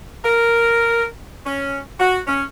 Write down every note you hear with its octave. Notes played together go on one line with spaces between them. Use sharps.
A#4
C#4
F#4
C#4